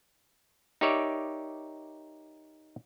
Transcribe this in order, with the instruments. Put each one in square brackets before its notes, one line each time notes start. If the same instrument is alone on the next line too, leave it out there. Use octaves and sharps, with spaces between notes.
[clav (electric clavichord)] D#4 G4 A#4 C#5 D5 E5